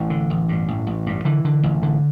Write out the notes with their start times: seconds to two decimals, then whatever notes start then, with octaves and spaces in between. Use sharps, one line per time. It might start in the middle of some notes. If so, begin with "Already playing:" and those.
Already playing: A1 E3
0.10 D3
0.30 A1
0.49 G2
0.68 A1
0.87 A1
1.06 G2
1.25 D3 E3
1.45 D3
1.63 A1
1.83 D3